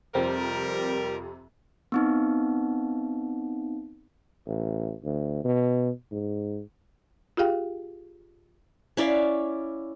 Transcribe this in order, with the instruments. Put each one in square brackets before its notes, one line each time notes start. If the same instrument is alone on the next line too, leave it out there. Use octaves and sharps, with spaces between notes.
[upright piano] F2 [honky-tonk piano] C3 [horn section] G3 A#4 [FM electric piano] C4
[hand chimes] B3 C4 D#4
[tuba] A1
D2
B2
G#2
[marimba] F4 G4 G#4 F5 G5
[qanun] C#4 E4 D5 F5